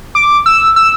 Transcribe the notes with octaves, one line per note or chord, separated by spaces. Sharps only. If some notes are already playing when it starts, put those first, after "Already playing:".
D6
E6
E6